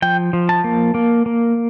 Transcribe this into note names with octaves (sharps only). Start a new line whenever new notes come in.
F3 G5
F3
A5
A#3
A#3
A#3